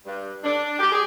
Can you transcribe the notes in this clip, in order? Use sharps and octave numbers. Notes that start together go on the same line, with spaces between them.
G2
D4
G4
G#4